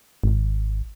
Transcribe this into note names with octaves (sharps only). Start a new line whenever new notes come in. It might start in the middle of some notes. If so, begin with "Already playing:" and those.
G#1